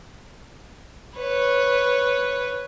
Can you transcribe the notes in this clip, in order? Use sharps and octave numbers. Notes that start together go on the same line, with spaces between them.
B4 C#5